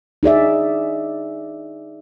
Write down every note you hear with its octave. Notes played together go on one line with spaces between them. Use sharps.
D#4 G#4 D5 E5